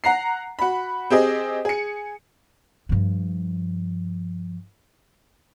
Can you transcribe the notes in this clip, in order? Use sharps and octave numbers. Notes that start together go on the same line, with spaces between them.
F#5 A#5 C7
F#4 B5
C4 G4 G#4 D#5
G#4 C#7
G2 F3